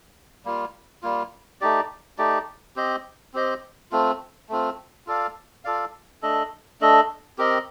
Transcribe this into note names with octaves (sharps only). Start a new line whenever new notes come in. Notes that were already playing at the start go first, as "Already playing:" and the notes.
G3 A#3 F4
G3 A#3 F4
A3 D#4 G4 D5
A3 D#4 G4 D5
C4 G4 C5 D#5
C4 G4 C5 D#5
A3 C4 F4
A3 C4 F4
F4 A4 D5 F5
F4 A4 D5 F5
A3 D4 A4 D#5
A3 D4 A4 D#5
C4 G4 A#4 D#5